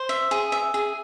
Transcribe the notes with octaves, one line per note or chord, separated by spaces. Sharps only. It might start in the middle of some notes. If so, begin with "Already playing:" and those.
Already playing: C5
E5
G#4
E5
G#4